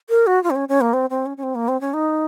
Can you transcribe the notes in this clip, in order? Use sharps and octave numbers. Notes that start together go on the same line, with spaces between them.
A#4
F#4
F4
C4
C#4
C#4
A#3
C4
C4
C#4
C#4
C4
A#3
C4
C#4
D#4